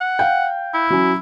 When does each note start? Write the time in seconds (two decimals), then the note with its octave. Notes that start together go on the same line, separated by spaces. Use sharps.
0.01 F#5
0.19 F5 G5
0.74 E4
0.90 F#3 C#4